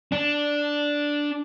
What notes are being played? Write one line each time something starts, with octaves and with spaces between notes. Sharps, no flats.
D4